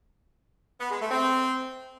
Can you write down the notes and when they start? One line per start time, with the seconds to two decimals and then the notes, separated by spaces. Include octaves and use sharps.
0.79 B3
0.90 G#3
1.01 A3
1.11 C4